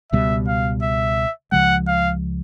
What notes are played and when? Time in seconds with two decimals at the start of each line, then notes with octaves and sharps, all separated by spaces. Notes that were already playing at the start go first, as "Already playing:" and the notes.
0.12 C#2 B2 G3 E5
0.48 F5
0.83 E5
1.52 C#2 C#3 F3 G#3 F#5
1.87 F5